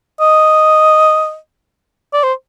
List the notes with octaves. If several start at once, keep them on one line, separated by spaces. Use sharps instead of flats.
D#5
D5
C5